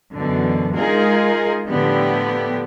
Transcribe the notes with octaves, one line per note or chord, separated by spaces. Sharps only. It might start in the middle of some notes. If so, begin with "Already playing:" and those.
F#2 B2 D3 E3
G#3 D#4 F4 G#4 A#4
A2 D3 F3 B3 G4